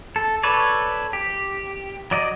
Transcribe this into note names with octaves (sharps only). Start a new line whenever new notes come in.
A4
A4 B4 C#5 D5
G4
F#3 D5 D#5